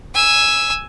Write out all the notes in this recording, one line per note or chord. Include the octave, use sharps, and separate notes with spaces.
G#5 E6